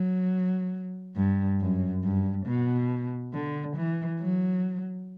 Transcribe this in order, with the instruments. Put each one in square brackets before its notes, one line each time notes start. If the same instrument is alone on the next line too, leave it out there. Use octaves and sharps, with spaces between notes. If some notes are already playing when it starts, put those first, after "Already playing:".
Already playing: [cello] F#3
G2
F#2
G2
B2
D3
E3
F#3